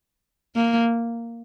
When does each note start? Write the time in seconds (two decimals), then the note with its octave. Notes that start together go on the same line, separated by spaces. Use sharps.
0.56 A#3